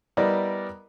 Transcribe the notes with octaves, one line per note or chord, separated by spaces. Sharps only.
G3 B3 E4 A#4 D5 D#5